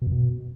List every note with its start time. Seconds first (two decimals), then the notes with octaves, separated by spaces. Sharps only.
0.02 B2
0.07 F#2
0.12 B2